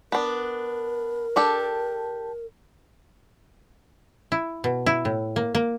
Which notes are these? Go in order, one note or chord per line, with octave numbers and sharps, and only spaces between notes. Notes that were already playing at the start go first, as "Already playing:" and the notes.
B3 D4 A#4
D4 G4 A4
E4
B2
E4
A2
A#3
A#3